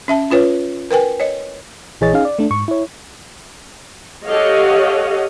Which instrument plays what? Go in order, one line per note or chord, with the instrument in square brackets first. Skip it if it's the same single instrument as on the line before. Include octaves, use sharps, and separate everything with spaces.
[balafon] C#4 E5 A5
C#4 F4 B4 C#5
A#4 B4 G5 G#5
C#5 D#5
[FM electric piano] A#1 E3 G#4 C#5 D#5 A6
C#4 D#4 G#4 F5
D5
A3 D4
G#2 C#6
E4 C#5
[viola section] G4 A4 C#5 D#5 F5 F#5